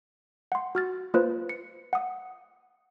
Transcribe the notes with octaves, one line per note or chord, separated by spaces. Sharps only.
F#5 C6
F#4 F6 A6
A#3 F4 B4 C5
C#7
F#5 D#6